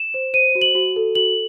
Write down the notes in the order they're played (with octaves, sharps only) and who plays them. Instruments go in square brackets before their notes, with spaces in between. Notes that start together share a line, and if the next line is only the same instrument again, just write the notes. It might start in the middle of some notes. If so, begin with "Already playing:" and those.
Already playing: [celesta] E7
C5
C5 D#7
F#4
F#7
F#4
A4
F#4 F#7